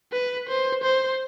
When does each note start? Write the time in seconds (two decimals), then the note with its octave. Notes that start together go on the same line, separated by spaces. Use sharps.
0.13 B4
0.49 C5
0.83 C5